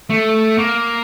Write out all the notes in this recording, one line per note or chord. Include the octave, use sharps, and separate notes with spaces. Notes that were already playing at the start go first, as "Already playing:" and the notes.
A3
A#3